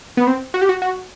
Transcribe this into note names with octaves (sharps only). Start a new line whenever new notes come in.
B3
C4
F#4
G4
F#4
F#4